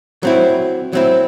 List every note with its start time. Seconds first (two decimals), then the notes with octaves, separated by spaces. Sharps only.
0.23 F#3 C4 E4
0.93 F#3 C4 E4